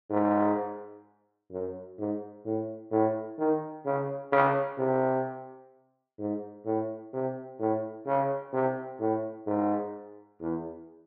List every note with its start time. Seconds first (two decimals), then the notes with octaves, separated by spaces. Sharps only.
0.10 G#2
1.51 F#2
1.99 G#2
2.45 A2
2.92 A2
3.38 D#3
3.86 C#3
4.32 C#3
4.78 C3
6.19 G#2
6.66 A2
7.13 C3
7.60 A2
8.07 C#3
8.53 C3
9.00 A2
9.47 G#2
10.41 E2